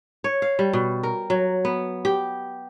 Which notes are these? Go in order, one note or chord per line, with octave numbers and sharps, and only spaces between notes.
C#5
F5
G3
B2
A#4
F#3
B3
G4